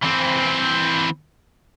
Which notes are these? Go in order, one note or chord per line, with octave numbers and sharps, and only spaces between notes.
E3 C4